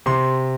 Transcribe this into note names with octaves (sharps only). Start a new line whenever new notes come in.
C3 C6